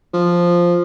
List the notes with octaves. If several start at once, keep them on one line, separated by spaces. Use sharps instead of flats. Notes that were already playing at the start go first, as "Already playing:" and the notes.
F3